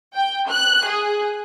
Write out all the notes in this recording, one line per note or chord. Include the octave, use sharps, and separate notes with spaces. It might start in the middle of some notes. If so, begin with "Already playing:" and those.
G5
F#6
G#4